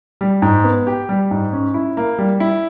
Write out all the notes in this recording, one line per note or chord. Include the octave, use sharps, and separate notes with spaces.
G3
G#2
B3
G4
G3
G#2
C#4
E4
A#3
G3
E4